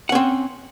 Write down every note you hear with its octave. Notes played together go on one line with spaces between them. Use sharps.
C4 C#4 F#5